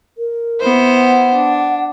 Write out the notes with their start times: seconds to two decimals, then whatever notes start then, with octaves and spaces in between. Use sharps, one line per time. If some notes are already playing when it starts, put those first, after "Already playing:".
0.18 A#4
0.60 B3 E4 C5
0.95 F#5
1.34 D4